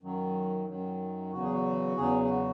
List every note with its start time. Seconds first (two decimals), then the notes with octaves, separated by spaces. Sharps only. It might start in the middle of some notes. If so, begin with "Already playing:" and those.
0.02 F#2 D#3 F#3
0.67 F#2 D#3 F#3
1.32 E2 C#3 F#3 F#4
1.43 G#4
1.54 F#4
1.97 E2 C#3 F#3 G#4
2.24 G#4
2.30 F#4